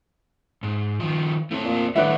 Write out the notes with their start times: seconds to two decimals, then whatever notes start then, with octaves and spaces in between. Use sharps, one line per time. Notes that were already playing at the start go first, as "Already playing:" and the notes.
0.63 G#2
1.00 D#3 F3
1.51 A2 A3 C4 A4
1.65 A#2
1.95 A2 D#3 G3 D4 B4 E5 F#5